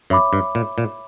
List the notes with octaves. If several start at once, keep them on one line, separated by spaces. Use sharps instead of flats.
F#2 C#5 E5 B5 D6
G2
A#2
A#2